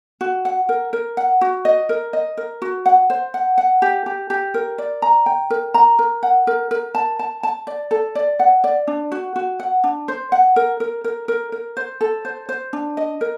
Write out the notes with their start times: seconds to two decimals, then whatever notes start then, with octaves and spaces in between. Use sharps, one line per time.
0.21 F#4
0.45 F#5
0.69 A#4
0.93 A#4
1.17 F#5
1.41 F#4
1.65 D#5
1.89 A#4
2.13 D#5
2.37 A#4
2.62 F#4
2.86 F#5
3.10 C5
3.34 F#5
3.58 F#5
3.82 G4
4.06 G4
4.30 G4
4.54 A#4
4.78 D5
5.02 A#5
5.26 G5
5.50 A#4
5.74 A#5
5.99 A#4
6.23 F#5
6.47 A#4
6.71 A#4
6.95 A5
7.19 A5
7.43 A5
7.67 D5
7.91 A4
8.15 D5
8.40 F#5
8.64 D5
8.87 D4
9.12 F#4
9.36 F#4
9.60 F#5
9.84 D4
10.08 C5
10.32 F#5
10.56 A#4
10.80 A#4
11.04 A#4
11.28 A#4
11.52 A#4
11.77 C5
12.01 A4
12.25 C5
12.49 C5
12.73 D4
12.97 D#5
13.21 A#4